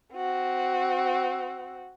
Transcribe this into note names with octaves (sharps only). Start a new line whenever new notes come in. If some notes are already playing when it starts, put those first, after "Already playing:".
C4 F#4